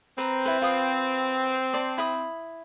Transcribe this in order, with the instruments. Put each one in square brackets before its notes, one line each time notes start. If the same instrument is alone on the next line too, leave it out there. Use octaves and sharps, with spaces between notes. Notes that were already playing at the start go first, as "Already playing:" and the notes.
[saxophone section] C4 [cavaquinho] B4 A#5
[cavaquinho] E4 B4
F4 B4 D#6
C5 D5 A5
E4 B5 D#6